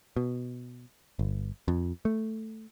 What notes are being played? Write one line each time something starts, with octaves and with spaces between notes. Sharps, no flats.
B2
G1
F2
A3